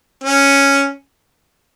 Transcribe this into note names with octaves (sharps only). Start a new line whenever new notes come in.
C#4